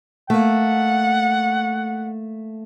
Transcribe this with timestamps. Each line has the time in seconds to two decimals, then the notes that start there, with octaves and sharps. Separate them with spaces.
0.30 A3 A#3 F#5